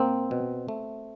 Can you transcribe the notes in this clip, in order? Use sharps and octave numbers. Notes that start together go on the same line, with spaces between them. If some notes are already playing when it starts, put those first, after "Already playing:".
Already playing: A#2 A#3 C4
B2
A3